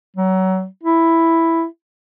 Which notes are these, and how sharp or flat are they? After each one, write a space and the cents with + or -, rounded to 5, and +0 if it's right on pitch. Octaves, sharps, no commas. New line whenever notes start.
F#3 +25
E4 +0